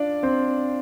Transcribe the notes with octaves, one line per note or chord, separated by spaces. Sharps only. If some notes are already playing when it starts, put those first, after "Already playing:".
Already playing: D4 F4 D5 F5
C4 C5